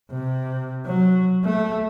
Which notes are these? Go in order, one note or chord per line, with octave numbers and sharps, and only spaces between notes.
C3
F#3
A3